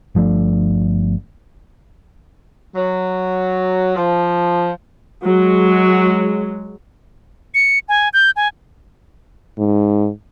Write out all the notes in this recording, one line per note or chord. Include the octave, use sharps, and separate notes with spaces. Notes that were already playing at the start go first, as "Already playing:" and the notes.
G1 F3 A3 D4
F#3
F3
F#3 G#3
C#7
G#5
G6
G#5
G#2